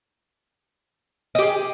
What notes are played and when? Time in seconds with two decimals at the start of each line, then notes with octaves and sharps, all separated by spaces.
1.35 D#5
1.39 G4
1.42 G#4